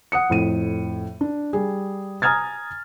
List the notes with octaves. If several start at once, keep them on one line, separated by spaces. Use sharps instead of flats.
F#5 D#6 C#7
F2 A2 D#7
D4
G3 G#4
G#5 A#5 D#6 F6 G#6 A6